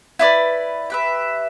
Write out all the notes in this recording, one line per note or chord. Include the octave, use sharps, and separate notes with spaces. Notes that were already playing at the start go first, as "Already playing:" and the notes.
E4 B4 D5
G4 B4 E5